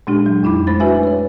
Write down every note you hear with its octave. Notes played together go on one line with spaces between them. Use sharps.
A#2 G#3 D4 G4
F#3
F2 D#4 E4 B5 D6
G#3 A3 C5 B5 A6
D4 F#4 B4 E5 G#5
B4 C#5